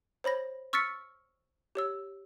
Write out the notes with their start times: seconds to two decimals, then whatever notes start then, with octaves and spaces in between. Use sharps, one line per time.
0.24 C5 C#5 B5 A#6
0.73 C#6 E6 F6 A6 B6 C#7
1.75 G4 C#5 E6